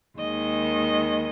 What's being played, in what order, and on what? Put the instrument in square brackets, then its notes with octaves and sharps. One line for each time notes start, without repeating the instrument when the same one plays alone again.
[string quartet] D#2 D#3 G#3 D#5